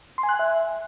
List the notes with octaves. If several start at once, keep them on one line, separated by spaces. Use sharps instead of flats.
C6
G#5
F#6
G#5
E5